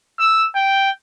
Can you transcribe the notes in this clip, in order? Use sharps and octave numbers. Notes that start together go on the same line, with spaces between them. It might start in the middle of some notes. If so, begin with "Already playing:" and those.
E6
G5